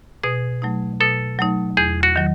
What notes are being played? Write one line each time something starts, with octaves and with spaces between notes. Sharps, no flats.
B2 G#4
F#3 A3 D#4
B2 A4
F#3 A3 D#4
E2 G#4
F#4
D#3 F#3